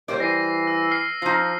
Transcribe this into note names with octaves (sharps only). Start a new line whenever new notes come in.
D#2 G3 C5 D5
E3 A#6 C7 D#7
E6
F6 C7
F3 D#4 F4